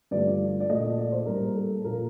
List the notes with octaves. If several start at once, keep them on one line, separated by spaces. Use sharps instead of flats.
G2 D3 F3 A3 D5
D5
A#2 A3 D#5
D5
C5
A2 G3 A#3 A#4
A4
A#2 F3 A#3 A#4